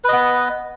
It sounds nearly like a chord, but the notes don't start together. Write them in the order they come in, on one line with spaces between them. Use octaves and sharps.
B4 D#5 B3